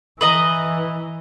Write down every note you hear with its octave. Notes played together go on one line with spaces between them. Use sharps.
E3 B4 D#5 A#5